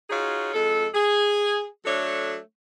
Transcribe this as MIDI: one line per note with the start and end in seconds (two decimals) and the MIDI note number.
0.10 0.53 63
0.10 0.53 65
0.10 0.53 66
0.10 0.53 68
0.10 0.53 73
0.54 0.87 41
0.54 0.87 56
0.54 0.87 69
0.94 1.64 68
1.85 2.37 54
1.85 2.37 57
1.85 2.37 62
1.85 2.37 69
1.85 2.37 73